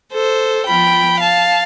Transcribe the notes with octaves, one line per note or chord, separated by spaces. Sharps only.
A4 C5
F3 B3 F4 G5 B5
F5 A5